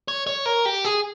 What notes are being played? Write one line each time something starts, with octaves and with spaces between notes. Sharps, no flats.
C#5
C#5
A#4
G4
G#4